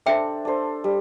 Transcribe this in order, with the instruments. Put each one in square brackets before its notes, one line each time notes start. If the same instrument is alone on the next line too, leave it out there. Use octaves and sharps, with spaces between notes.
[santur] D4 A4 C5 [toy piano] E5 G5
[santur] D4 A4 C5
G3